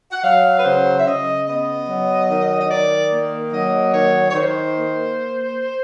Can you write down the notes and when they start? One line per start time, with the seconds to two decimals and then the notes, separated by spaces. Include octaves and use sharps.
0.10 F#5
0.23 F#3 F5
0.58 B4
0.64 C#3 C5
0.98 E5
1.05 C#3 D#5
1.46 B3 D#5
1.88 F#3
2.29 D#3
2.60 D#5
2.69 D#3 D5
3.11 A#3
3.52 F#3 D#5
3.92 D#3 C#5
4.29 C#5
4.34 D#3 C5
4.75 A#3